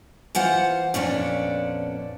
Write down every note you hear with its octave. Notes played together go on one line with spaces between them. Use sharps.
E3 F4 C5 F#5
F2 A#2 B3 C#4 D4